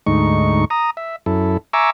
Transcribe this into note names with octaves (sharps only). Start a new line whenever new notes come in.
D2 G#2 D#4 C#6
A#5 D#6
E5
F#2 E4 A4
E5 G#5 A#5 C#6 D6 E6